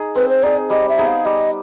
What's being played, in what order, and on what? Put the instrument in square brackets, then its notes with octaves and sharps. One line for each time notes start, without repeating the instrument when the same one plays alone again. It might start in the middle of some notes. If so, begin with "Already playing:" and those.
Already playing: [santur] D#4 G#4
[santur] C4 [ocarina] B4
[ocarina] C5
[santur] D#4 G#4 [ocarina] D5
[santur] G3 [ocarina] D#5
[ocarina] E5
[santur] B3 D#4 G#4
[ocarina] F5
[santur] G3 [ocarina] D#5